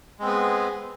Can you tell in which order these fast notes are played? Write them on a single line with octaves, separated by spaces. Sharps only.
G#3 C4 B3 G#4